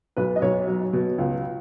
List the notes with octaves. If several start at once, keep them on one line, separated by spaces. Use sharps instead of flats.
B1 B4
D#5
B1 C#5
F#3
B2
C#2